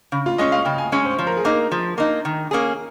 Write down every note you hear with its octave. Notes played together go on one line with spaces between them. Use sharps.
C#3
F4
G#3 C#4 D#5
F5
C#3 G5
G#5
G#3 C#4 G#5
C5
F3 C5
A#4
G#4
A#3 D#4 A#4
F3
A#3 D#4
D#3
A#3 C#4 G#4